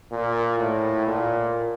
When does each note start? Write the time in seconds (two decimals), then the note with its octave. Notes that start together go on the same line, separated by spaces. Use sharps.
0.12 A#2
0.59 A2
1.07 A#2